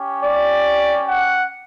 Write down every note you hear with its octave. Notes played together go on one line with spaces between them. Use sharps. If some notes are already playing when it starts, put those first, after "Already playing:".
Already playing: C#4 G4
D5
F#5